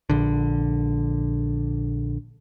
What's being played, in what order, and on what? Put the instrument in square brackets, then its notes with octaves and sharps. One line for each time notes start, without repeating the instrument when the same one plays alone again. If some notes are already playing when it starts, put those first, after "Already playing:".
[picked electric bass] A#1 D3